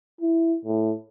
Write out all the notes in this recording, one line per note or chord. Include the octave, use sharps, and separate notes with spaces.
E4
A2